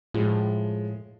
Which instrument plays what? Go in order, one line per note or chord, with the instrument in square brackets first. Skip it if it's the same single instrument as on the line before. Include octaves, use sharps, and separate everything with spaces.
[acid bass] A2 [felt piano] F3 G#3